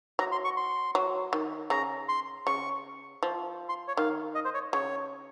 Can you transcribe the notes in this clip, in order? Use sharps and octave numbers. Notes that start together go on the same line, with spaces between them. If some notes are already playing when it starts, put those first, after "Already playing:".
F#3 A#5
C6
C#6
C6
F#3
D#3
C#3 A#5
C6
C#3 C#6
F3
C6
C#5
D#3 F5
D#5
C5
C#5
C#3 C#5